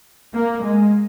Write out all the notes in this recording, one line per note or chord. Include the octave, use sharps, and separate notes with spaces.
A#3
G#3